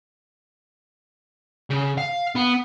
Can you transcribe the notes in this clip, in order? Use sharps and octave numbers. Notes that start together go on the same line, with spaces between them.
C#3
F5
B3